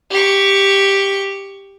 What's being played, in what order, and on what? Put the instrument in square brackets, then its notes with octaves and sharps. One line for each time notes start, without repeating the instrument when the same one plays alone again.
[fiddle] G4 C#6